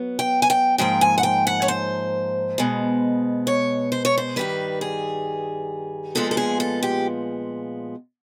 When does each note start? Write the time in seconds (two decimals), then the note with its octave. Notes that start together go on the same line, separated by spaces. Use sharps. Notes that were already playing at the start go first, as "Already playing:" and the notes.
Already playing: F#3 B3
0.19 G5
0.42 G#5
0.50 G5
0.78 G#2 F3 A#3 G5
1.01 G#5
1.18 F#5
1.23 G5
1.47 F#5
1.62 C#5
1.68 C5
2.58 B2 G#3 B3
3.47 C#5
3.92 C5
4.05 C#5
4.18 C5
4.36 G2 D#3 G3 B4
4.81 G#4
6.15 A#2 F3 G#3 B3 A4
6.31 A4
6.37 G#4
6.60 A4
6.83 G4